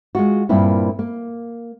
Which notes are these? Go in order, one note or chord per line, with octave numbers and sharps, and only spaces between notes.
G#3 F4 F#4
G2 A#2 A#3 C4 E4
A#3